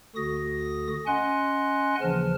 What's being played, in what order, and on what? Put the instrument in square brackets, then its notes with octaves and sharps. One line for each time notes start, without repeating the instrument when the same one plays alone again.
[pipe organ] D2 D3 F#4 D#6 A#6
C#4 D#5 F#5 G#5 C6 F#6
D#2 C#3 E3 F3 A5 F6